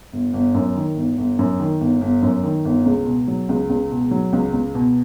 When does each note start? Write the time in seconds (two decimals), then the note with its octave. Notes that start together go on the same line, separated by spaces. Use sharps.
0.12 G1
0.33 G1
0.54 F#2
0.76 D#3
0.96 G1
1.17 G1
1.39 F#2
1.60 D#3
1.80 G1
2.01 G1
2.22 F#2
2.43 D#3
2.65 G1
2.86 C#2
3.06 B2
3.28 F#3
3.49 C#2
3.70 C#2
3.91 B2
4.11 F#3
4.33 C#2
4.53 C#2
4.75 B2